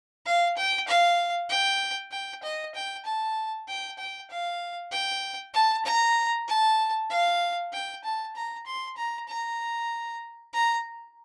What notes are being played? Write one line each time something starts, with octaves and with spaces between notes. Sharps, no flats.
F5
G5
F5
G5
G5
D#5
G5
A5
G5
G5
F5
G5
A5
A#5
A5
F5
G5
A5
A#5
C6
A#5
A#5
A#5